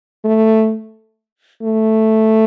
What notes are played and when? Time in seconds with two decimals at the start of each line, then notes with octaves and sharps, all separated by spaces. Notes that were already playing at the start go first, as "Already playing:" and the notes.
0.25 A3
1.63 A3